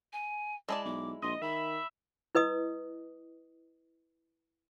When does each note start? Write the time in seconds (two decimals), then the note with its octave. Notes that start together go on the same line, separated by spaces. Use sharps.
0.13 G#5
0.69 G#3 E4 D5 A5
0.85 B1 D6
1.22 A#1 D#5 C6
1.42 D#3 E5 B5
2.35 E4 B4 D#5 D#6